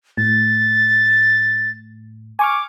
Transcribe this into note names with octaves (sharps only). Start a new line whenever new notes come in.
A2 A6
G#5 C#6 D6 F6